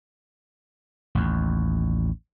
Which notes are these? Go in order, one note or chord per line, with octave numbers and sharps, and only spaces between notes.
A1 D#2